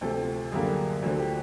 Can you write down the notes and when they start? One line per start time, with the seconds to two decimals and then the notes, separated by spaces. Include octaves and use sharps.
0.01 D2 C3 F3 A4
0.52 F#2 D3 G3 A#3 G#4
1.02 D2 D3 F3 F#4
1.19 G4